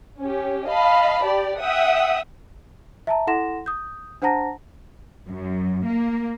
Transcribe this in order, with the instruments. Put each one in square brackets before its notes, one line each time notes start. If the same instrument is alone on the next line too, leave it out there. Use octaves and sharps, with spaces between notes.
[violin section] C#4 G4
D#5 F5 A5 B5
G4 D5
E5 F#5 G5 D#6
[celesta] E5 A5 A#5
E4 A4 F#5 C6 A#6 E7
D#6 G6
D4 C5 F#5 A5 A#5 A#6
[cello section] F#2
A#3